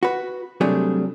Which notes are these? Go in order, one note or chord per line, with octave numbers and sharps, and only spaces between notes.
F#4 B4
C3 F#3 G3 A3 D4 G#4